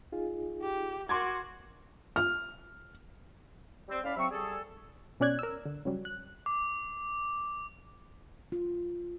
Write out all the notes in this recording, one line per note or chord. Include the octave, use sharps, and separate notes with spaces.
D#4 F4 G#4
G4
F#4 A#4 C6 D6 G#6
F6
G3 C4
A2 C#4 D5 F5 B5
C3 F#3 C4 E5 C#6
G3 G#4 A4
B2 C#4 D5 F#6 G#6
A#4 E6
D3
C#3 F#3 G3
F#6
D6
F4